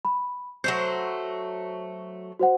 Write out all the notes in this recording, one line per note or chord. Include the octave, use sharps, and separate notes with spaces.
B5
F#3 A3 C5 G6
F#4 C5 F#5